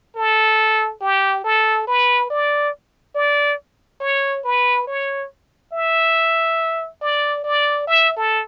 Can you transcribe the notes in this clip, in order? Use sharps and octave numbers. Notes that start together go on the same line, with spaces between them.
A4
G4
A4
B4
D5
D5
C#5
B4
C#5
E5
D5
D5
E5
A4